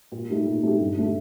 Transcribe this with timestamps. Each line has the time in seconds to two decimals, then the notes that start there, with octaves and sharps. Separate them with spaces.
0.12 A#2
0.29 A3 D#4 G4
0.46 A#2
0.63 A3 D#4 G4
0.80 G2
0.97 D3 A3